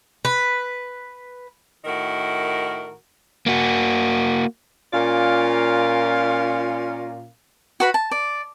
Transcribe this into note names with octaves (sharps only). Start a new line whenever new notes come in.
B4
A2 D#3 F#4 A#4
A#3 F#4
A#2 C#4 F4 A#4 D5 F5
F#4 B4 B5
A5
D5